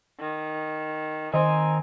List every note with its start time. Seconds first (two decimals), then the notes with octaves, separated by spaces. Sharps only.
0.19 D#3
1.34 D#3 C4 D#4 G#5